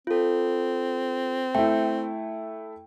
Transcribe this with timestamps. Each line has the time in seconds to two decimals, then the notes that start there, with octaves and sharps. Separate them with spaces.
0.07 C4 F4 A4
1.55 A3 E4 G5